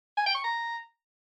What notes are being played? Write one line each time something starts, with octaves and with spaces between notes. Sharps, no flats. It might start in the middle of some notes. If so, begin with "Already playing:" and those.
G#5
G5
C#6
A#5